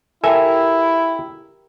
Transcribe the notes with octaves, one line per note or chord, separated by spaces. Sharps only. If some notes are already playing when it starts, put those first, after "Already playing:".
E4 G4 A4 A#4 E5 G#5